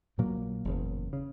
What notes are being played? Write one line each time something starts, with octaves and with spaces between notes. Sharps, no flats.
A#1 A#2 F#3 A#3
F#1 E2 C#3
C#3